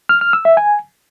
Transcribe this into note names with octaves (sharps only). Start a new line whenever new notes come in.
F6
F6
E6
E5
G#5